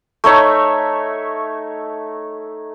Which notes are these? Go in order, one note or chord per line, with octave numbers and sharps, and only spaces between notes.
A3 D#4 C#5 E5